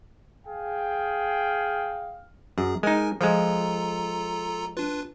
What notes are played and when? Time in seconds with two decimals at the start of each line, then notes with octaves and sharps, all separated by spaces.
0.45 G#4 F5 G5
2.58 F#2 G#4
2.83 G#3 D#4 A#4 G#5
3.21 F3 G#3 F4 A4 A#5
4.77 D4 F4 B4